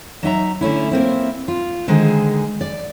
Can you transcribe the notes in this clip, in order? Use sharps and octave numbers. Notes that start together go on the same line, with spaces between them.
F#3 D#4 E5 A#5
D3 A3 C#4 E4
A#3 C4 E4
F4
D3 D#3 G#3 G#4 C5
D5